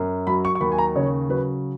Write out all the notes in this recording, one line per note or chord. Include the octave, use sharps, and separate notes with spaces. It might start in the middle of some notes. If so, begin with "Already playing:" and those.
Already playing: F#2
F#3 B5
C#6
C#6
D#2 B5
G#5
A#5
C#3 C#5
F#3 B4